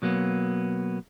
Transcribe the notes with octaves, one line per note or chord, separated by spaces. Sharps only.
B2 F#3 A#3 B3